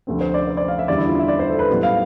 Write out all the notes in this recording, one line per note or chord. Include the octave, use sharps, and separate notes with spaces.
D2 C3 F3 A3 C4
C5
D5
C5
D5
F5
E5
E2 D3 G3 D5
E4
F4
E5
D5
C5
A4
B4
B1 A2 G3 B3
F5